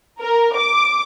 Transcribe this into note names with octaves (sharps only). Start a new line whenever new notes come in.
A#4
D6